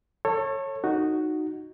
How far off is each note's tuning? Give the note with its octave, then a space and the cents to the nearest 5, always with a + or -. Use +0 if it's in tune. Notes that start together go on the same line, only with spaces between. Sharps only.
A4 +25 C#5 -20
D#4 -5 F#4 +0